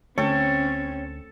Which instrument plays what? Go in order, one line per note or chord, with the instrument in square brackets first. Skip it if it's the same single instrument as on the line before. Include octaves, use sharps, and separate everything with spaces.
[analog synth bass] D2 [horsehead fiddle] C4 C#4 [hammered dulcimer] A4 [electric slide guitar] C#5 G5